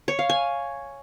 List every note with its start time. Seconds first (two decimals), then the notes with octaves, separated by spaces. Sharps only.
0.08 C#5
0.19 F5
0.30 G#5